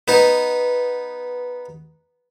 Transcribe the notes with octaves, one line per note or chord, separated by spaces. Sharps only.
B3 D#4